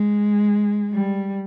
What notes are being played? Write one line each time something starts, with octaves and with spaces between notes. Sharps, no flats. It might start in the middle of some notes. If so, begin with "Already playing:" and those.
Already playing: G#3
G3